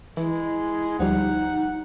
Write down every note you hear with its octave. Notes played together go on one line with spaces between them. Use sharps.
E3 G#3 E4
D2 F3 G3 D#4 F#5